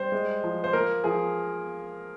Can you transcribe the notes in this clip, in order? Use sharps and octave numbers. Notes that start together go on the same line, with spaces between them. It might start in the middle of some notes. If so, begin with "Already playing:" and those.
Already playing: G3 C5
G#3
F3
C5
A#3 A#4
F3 G#4